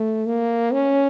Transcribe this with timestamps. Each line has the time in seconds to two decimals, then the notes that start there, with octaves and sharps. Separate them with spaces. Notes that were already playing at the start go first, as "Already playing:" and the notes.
Already playing: A3
0.26 A#3
0.73 C#4